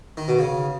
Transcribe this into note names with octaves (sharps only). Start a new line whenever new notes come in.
D#3
B2
C#3